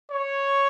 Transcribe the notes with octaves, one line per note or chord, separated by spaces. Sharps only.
C#5